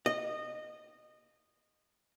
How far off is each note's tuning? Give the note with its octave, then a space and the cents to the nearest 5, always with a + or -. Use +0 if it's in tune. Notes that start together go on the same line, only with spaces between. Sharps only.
D#5 -20